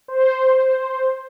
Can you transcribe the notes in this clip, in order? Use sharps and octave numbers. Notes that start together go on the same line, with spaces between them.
C5